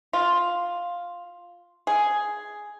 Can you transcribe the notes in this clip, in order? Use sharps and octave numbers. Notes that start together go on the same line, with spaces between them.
F4
G#4